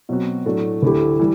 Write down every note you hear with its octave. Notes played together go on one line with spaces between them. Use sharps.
B2 F#3 C4 F#4
A2 F#3 A3 D4 F#4
D2 D3 A3 E4 G4
E3 G3